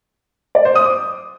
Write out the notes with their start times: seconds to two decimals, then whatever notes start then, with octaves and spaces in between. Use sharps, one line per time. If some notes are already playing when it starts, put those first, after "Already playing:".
0.55 D5
0.65 C5
0.75 D#6
0.86 D6